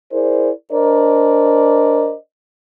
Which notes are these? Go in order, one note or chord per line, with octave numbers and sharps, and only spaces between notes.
E4 G#4 A#4 C5 D5
D4 A#4 C5 D5 D#5